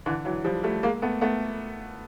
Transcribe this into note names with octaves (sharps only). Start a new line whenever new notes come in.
D3 E3
E3 F#3
F3 G3
G3 A3
G#3 A#3
A3 B3
A3 B3